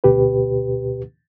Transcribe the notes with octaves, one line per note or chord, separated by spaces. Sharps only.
D2 B2 G4 B4